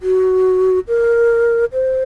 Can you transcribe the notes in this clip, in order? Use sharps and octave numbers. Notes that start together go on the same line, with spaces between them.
F#4
A#4
C5